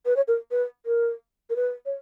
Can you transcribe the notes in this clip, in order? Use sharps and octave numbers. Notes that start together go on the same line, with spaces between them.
B4
C#5
A#4
B4
A#4
A#4
B4
C#5